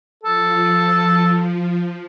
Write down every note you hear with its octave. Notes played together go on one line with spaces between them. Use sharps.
F3 A4